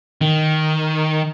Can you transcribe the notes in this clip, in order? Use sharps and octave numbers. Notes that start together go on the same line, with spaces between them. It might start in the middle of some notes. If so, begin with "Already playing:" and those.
D#3